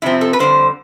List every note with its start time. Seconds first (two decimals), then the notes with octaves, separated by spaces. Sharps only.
0.02 F2 C3 F3 C4 E4
0.21 A4
0.33 B4
0.39 F2 D3 G3 C5